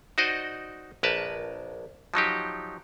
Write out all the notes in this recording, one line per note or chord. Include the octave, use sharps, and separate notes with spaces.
D#4 F#4 C5 D5 D#5
A#1 A#4 B4 A5
F3 F#3 D#4 G4